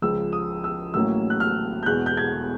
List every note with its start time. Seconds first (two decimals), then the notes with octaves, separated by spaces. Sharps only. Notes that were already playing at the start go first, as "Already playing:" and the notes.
0.02 C#2 C#3 F3 E6
0.33 D#6
0.64 E6
0.94 A1 A2 F#3 A#3 C#4 E6
1.30 F#6
1.40 F6
1.83 G6
1.86 E2 B2 G#3 F#6
2.06 G6
2.17 G#6